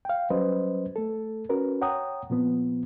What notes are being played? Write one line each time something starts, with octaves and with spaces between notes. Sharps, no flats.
F5 G5
F#3 G3 C#4 B4 C5 D#5
A3 A4
C#4 F#4 A#4 B4
C#5 F#5 G5 A#5 D#6
A#2 F3 B3 C4